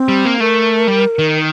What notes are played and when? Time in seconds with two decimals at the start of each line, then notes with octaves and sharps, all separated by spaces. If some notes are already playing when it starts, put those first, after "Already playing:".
Already playing: C4
0.08 G3
0.25 A#3
0.40 A3 A#4
0.88 G3
1.19 D#3